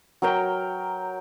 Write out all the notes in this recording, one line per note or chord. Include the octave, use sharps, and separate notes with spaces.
F#3 A#4 G5